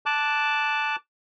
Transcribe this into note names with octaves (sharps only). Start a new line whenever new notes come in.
A5 D6 F#6